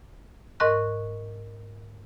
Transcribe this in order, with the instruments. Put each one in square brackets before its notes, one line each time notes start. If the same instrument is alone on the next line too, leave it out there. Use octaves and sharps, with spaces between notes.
[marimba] G#2 A#4 D#5 C#6 F#6